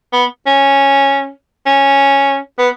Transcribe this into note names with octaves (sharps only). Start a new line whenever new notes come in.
B3
C#4
C#4
B3